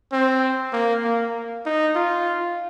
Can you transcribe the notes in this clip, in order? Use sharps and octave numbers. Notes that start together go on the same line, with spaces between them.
C4
A#3
A#3
D#4
F4